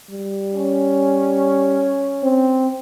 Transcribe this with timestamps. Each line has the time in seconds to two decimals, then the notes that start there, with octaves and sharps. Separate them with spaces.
0.11 G3
0.54 C#4
2.23 C4